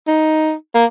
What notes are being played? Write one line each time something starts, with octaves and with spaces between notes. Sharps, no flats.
D#4
A#3